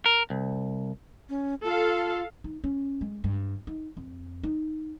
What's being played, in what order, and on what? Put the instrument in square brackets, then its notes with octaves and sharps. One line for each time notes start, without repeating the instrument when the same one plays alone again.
[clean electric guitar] A#4
C2
[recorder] C#4
[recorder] F4 [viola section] A4 F5
[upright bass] D#4
C#4
G#3
G2
D#4
F2
D#4